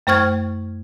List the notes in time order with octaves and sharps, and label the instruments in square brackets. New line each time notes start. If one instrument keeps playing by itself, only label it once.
[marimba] F#2 A3 C5 C#6 F6 G#6